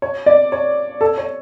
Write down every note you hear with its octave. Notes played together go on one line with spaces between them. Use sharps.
C#5
D5
C#5
A4
C#5